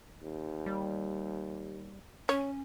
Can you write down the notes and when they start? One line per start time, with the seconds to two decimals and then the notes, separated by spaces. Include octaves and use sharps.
0.23 D#2
0.66 G3
2.29 C#4 C#5